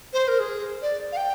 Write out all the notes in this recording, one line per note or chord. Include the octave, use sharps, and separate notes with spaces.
C5
A#4
G#4
D5
F5
G5